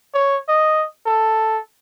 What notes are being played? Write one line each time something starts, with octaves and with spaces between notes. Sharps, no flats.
C#5
D#5
A4